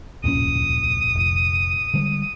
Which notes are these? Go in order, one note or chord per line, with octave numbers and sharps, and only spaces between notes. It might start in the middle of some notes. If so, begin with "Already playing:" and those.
D1 C2 F2 A#2 C#4 D#6
F1
D3 G3 G#3